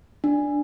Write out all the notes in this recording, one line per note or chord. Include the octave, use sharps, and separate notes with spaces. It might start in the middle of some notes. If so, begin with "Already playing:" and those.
D4